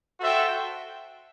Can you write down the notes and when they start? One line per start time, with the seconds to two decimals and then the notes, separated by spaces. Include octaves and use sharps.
0.20 F#4 A4 C5 E5 G5